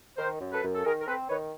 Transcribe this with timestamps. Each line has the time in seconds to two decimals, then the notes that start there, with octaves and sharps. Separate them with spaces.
0.18 D#3 A#4 C5
0.40 F#2
0.52 A4 B4
0.62 F#2
0.75 A4
0.85 D#3 G#4 A#4
1.01 A#4
1.07 C4 A4 B4
1.29 D#3 B4 C#5